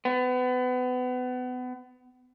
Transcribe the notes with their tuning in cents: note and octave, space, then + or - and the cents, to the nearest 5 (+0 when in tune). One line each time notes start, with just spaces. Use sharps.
B3 +30